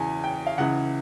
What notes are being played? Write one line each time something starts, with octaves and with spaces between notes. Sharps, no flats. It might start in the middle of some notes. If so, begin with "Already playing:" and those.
Already playing: E2 C#3 E3 G#5
G5
F5
C#2 C#3 E3 F#5